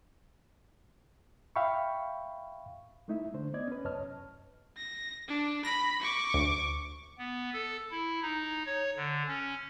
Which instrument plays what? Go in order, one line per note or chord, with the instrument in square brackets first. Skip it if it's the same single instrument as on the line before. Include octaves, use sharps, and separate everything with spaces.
[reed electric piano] E5 F5 G5 B5 C#6
G#3 A3 D#4 E4 E5
D3 A3 D4 C5
B3 D5 D#5 G#6
C#4 B4
C2 F#2 C#5 D#5 A5 F6
[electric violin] A#6
D4
[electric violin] B5 [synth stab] A#6
[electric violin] C#6 D6
[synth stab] D2
[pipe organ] B3
A4
E4
D#4
C#5
D3
C#4